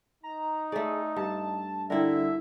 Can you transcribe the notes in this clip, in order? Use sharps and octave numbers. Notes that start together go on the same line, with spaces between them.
D#4 A#5
A3 G#4 D5
G2 A5
D3 G3 E4 A4 A#4 E5